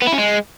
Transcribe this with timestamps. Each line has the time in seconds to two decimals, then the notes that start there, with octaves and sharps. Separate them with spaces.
0.02 B3
0.07 E4
0.13 C#4
0.18 G#3